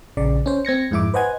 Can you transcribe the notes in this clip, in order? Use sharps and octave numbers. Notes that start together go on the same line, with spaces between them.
A#1 C#3 D5
C#4 C5
C4 G#6 A#6 C#7
F2 G#2 E4 E5 D6
B4 C5 D#5 F#5 G#5 G#6